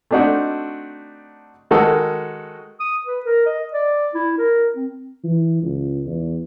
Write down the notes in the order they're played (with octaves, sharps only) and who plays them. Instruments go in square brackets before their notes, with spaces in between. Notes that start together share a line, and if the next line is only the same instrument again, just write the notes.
[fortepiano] A3 C4 D4 D#4 F#4
D#3 G#3 D#4 F#4 A4 A#4
[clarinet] D#6
B4
A#4
D#5
D5
E4
A#4
C4
[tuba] E3
C#2
E2